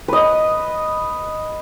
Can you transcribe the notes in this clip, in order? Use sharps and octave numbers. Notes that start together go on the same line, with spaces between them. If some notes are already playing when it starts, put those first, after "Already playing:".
B4 D#5